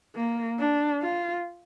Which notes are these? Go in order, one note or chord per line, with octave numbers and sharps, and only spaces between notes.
A#3
D4
F4